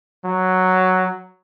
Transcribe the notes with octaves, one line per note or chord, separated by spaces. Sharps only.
F#3